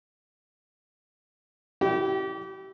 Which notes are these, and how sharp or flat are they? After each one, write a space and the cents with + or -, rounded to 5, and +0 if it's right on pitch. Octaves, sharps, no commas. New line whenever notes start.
E4 +0 G4 -35 G5 +0